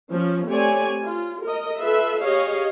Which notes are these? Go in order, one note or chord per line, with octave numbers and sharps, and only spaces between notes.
F3 C#4
A3 C4 G4 C#5 D5 G#5
F4
A#4 D#5
F4 A4 B4 E5
G4 G#4 C#5 D#5 F5